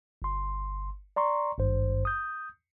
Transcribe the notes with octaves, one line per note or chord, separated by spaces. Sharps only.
G1 C6
D5 A#5 C6 C#6
G#1 G2 C5
D#6 G6